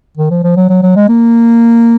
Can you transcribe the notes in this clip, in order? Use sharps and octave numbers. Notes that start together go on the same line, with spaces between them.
D#3
F3
F3
F#3
F#3
F#3
G#3
A#3